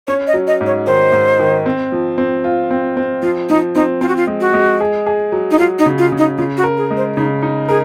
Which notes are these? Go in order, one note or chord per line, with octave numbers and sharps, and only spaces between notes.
C#4 C#5
D#5
F#3
D#5
G#2
C#5
D#3 C5
G#2
D#3
C4
F3
C4
F4
C4
C4
F3 F4
F3 D#4
C4 D#4
C4 F4
F#4
F4
G#3
F#4
G#3
G#4
G#4
F#3
D#4
F#3 F4
D#4
C#3
F4
C#3
D#4
C#3 F4
F#4
A#4
G#4
G#3
C5
C#3 D#4
D#4
G#4 A#4